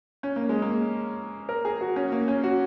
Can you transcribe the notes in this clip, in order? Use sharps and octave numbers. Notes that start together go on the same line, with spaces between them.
C#4
A#3
G#3
A#3
A#4
G#4
F#4
C#4
A#3
C#4
F#4